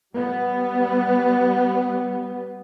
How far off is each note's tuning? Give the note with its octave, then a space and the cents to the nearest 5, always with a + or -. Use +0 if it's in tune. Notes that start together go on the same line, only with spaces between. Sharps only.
G3 -20 B3 +0